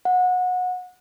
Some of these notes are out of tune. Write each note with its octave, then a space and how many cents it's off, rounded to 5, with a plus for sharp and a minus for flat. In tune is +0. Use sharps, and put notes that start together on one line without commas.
F#5 -25